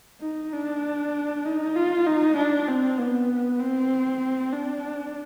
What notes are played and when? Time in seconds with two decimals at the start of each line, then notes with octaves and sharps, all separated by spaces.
0.21 D#4
0.53 D4
1.45 D#4
1.76 F4
2.07 D#4
2.37 D4
2.68 C4
2.99 B3
3.60 C4
4.52 D4